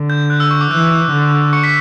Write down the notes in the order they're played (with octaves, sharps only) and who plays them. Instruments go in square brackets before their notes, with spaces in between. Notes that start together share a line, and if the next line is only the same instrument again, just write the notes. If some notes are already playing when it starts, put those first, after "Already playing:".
Already playing: [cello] D3
[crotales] G6
F#6
E6
C#6
D6
[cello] E3 [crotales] F#6
[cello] D3
[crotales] C#6 C#7
B6